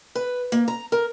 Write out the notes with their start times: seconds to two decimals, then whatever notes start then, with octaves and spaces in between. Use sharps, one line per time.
0.15 B4
0.52 A#3
0.68 A#5
0.92 A#4